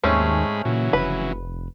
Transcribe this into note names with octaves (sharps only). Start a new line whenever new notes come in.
D#2 G#2 G#3 A3 C4 C#4 B5
A#2 C#3 E3 F#3
F1 B4